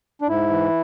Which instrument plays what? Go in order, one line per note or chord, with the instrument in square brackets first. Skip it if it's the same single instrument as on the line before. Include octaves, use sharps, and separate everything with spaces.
[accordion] D4
G#2 E4
E3